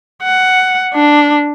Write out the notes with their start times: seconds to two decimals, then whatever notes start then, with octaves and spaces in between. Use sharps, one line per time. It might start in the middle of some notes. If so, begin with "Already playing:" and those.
0.22 F#5
0.94 D4